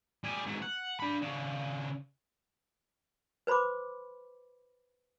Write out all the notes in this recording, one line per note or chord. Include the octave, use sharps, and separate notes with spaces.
G3 G#4
G#2 F#3
F#5
D4 B5
C#3 D4
B4 C5 B5 C6 D6